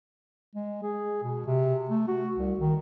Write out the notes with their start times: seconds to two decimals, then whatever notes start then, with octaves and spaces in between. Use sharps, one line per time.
0.55 G#3
0.83 G#4
1.23 B2
1.46 C3
1.89 A3
2.08 F#4
2.37 C2
2.59 D#3